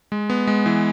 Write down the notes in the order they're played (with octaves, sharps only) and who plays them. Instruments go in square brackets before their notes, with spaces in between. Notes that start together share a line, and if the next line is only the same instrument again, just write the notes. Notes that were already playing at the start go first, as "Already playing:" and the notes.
[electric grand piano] G#3
B3
G#3
E3